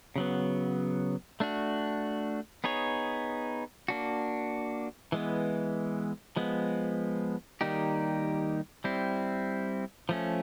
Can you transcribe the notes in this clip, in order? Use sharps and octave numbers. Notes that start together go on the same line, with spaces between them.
C#3 F#3 B3
A3 D4 F#4
B3 D#4 G#4 C#5
A#3 D4 F#4
E3 G#3 B3
F3 G#3 B3
D#3 G3 A#3 D#4 G4
G3 C4 E4
F3 A3 C#4